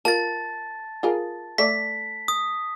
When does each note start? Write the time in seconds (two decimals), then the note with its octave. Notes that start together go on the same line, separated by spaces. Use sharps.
0.05 F4 A#4 A5 A6
1.03 F4 G#4 A#4
1.58 A3 A4 D5 B6
2.28 D#6